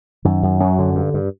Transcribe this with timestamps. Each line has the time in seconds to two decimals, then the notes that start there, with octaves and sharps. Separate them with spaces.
0.25 F#2 D#3
0.43 F#2
0.60 F#2 F#3
0.79 D3
0.95 G2
1.14 G2